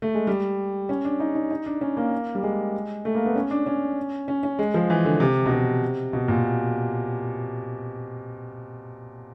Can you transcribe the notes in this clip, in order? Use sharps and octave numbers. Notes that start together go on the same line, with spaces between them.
A3
G#3
G3
C#4
D4
D#4
D#4
D#4
D4
C#4
A#3
G3
G#3
A3
A#3
B3
C#4
D4
C#4
C#4
C#4
G#3
F3
E3
D3
C3
B2
C3
B2
A#2